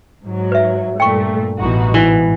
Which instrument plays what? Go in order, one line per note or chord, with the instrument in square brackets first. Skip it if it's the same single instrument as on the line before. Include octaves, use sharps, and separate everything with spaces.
[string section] G#2 F#3
[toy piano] B4 E5
[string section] G2 A#2 A3 [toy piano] G5 C#6
[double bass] A1 B2 [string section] E3 D#4 F#4
[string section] G#2 [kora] E3